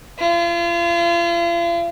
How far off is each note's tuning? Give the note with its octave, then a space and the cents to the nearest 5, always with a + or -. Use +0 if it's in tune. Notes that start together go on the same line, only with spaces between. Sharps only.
F4 -40